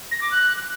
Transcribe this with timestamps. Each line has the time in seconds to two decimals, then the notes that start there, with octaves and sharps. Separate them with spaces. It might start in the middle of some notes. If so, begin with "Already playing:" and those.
0.11 A#6
0.21 D6
0.31 F#6